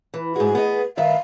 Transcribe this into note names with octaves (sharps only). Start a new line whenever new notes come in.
E3
G#2 F#4 G#4
B3 D#5
G2 D#3 E5 F5